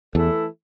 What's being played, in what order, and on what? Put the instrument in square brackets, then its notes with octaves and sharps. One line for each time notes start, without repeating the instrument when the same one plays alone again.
[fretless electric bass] E2 [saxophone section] E3 A3 E4 A4